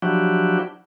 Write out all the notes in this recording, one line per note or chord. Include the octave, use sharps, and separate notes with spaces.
F3 F#3 D4 E4 F#4 G4